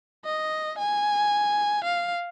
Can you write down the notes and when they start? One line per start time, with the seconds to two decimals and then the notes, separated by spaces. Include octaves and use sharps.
0.25 D#5
0.78 G#5
1.84 F5